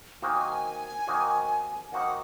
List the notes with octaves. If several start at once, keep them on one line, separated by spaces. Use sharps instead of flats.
D#3 A#3 D#4 F#4 C5 G#5
D#3 A#3 D#4 F#4 C5
D#3 A#3 D#4 F#4 C5 F#5